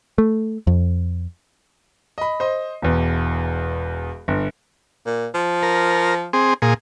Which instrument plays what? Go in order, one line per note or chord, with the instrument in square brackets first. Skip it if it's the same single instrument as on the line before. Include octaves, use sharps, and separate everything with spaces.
[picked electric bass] A3
F2
[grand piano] D#5 B5
C5 D#5
E1 E2
G1
[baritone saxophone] A#2
F3
[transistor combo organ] A#4
C4 G#4
A#2 G#4